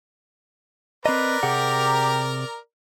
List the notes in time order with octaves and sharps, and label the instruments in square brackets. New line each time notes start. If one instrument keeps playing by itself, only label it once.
[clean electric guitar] C4 D#5 [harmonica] A#4 D5 A#5 [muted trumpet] B4
[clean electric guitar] C3 G#4 F#5 [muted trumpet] G4